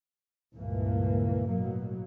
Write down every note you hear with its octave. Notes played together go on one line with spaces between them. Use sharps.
C#2 G2 A#2 E3 A#3
A1 B2 F#3 A#3